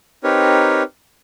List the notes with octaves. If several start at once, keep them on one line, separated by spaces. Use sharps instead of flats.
C4 D#4 G4 A#4 B4 C#5